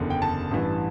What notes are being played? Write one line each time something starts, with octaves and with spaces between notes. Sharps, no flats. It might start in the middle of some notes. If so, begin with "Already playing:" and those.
Already playing: F#1 E2 D3
G5
A5
A1 G2 E3